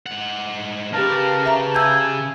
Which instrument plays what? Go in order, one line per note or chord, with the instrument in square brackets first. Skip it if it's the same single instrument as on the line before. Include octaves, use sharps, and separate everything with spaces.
[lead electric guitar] G#2 F#5
[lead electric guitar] C#3 F5 [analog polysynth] G4 B4 A5 [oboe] A#4
[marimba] E5 A#5
[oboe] G#5 [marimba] E6 G6